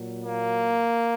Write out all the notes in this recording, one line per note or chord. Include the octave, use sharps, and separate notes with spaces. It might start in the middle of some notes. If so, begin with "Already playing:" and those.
Already playing: A#2 F#3
A#3